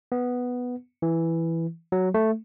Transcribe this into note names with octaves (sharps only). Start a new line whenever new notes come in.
B3
E3
F#3
A3